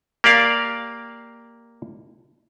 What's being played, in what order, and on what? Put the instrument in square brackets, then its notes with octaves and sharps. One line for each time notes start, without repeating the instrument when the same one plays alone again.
[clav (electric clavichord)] A#3 G4 D5 F5